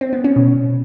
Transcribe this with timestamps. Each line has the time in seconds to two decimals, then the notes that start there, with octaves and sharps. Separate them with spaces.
0.01 C4
0.13 B3
0.24 C#4
0.36 B2